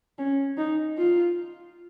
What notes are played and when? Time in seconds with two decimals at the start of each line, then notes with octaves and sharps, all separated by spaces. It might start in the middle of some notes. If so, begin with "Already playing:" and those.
0.18 C#4
0.58 D#4
0.97 F4